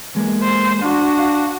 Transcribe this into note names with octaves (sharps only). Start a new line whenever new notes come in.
E2 G#3 A#3
C5
D4 F#4
F5